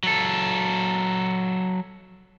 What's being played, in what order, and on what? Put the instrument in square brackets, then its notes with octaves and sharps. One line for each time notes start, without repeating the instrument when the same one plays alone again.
[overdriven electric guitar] F#3 A4